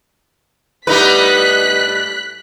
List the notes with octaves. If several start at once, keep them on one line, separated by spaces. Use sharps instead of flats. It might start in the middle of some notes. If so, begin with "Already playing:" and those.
A2 G3 B3 D#4 B4 F#6 B6